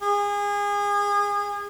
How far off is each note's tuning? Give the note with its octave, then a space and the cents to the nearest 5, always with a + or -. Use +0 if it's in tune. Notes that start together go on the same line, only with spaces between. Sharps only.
G#4 -30